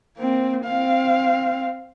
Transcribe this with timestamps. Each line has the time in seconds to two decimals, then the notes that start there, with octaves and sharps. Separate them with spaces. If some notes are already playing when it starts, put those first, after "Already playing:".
0.18 A#3 C4
0.65 C4 F5